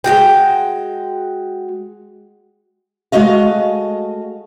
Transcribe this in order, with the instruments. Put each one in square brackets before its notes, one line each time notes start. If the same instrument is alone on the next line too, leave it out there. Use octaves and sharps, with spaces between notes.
[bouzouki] G#3 C#4 F#4 G5
[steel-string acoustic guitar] G#3 A3 F#4 D#5 F5